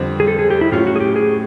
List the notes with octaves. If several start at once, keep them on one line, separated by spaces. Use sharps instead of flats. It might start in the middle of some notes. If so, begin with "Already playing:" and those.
Already playing: F2 D3 G3 C4
G#4
A4
G#4
G4
E4
A2 F#3 A3 C#4 F4
F#4
G#4
G4
G#4